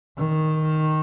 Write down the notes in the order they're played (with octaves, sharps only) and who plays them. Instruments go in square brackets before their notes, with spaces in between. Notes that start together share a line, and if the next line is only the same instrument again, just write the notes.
[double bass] D#3